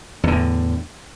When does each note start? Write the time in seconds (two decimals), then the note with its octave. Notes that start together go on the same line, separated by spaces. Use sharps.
0.24 E2
0.28 D3
0.32 A2